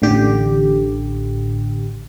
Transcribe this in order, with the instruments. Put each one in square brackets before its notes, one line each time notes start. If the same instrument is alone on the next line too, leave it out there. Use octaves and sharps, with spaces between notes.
[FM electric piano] A1 D3 G4